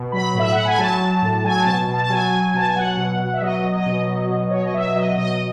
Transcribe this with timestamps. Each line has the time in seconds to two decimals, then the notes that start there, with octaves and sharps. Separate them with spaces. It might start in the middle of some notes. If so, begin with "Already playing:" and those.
Already playing: B2
0.12 F#3 B5
0.35 A2 E5
0.52 A2 F#5
0.66 G#5
0.78 F#3 A5
1.01 F#3
1.22 A2
1.44 F#3 G#5
1.60 A5
1.66 B2
1.88 B2
1.94 A5
2.04 A5
2.09 F#3 G#5
2.32 F#3
2.54 B2 A5
2.67 G#5
2.76 F#3 F#5
2.97 B2
3.19 B2
3.34 E5
3.41 F#3 D#5
3.64 F#3
3.75 D#5
3.86 B2
4.08 F#3
4.30 B2
4.50 B2 C#5
4.62 D#5
4.74 F#3 E5
4.96 F#3 D#5
5.18 B2 D#5